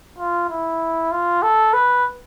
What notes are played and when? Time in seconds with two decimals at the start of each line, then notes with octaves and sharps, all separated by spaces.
0.19 F4
0.50 E4
1.12 F4
1.42 A4
1.74 B4